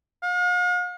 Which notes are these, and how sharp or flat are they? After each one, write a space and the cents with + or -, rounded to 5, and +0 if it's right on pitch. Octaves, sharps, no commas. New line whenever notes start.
F5 +45